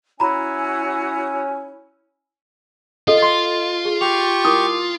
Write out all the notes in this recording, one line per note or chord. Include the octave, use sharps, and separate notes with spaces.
C#4 E4 F#4 C#5 G#5 A#5 B5
F4 A4 D#5
C6
G#4
G4 C#6 F7
E4 A#4 D6 D#6